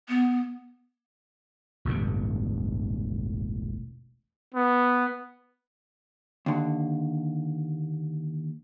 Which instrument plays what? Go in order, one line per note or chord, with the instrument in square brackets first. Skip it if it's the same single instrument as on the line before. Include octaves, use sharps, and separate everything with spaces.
[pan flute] B3
[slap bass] E1 A1 G2 D3
[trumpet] B3
[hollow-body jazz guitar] D#2 D3